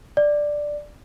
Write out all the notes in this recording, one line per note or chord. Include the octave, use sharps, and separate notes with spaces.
D5